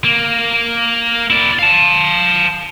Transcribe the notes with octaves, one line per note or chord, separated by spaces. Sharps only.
A#3
E4 D5
F5 A5